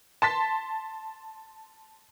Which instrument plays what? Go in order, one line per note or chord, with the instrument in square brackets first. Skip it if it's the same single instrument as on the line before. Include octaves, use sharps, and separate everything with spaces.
[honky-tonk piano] A5 C6 A6 B6